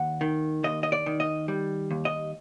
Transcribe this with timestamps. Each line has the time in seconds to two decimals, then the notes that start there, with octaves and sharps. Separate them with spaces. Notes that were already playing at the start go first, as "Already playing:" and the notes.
Already playing: D#2 F#5
0.21 D#3
0.64 D#2 D#5
0.83 D#5
0.92 D5
1.06 D#3
1.20 D#5
1.48 G3
1.91 D#2
2.05 D#5